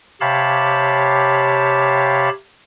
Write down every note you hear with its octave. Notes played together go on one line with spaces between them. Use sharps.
C3 G4 C#5 F5 A5 B5